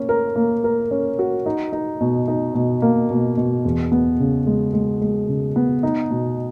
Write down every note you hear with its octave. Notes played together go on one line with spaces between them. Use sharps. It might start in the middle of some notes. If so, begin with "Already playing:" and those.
Already playing: A#3 C#4
A#4
A#3
A#4
C#4
F#4
D#4
D#4
B2
D#4
B2
A#3
B2
B2
E2
B3
C#3
G#3
G#3
G#3
C#3
B3
D#4
B2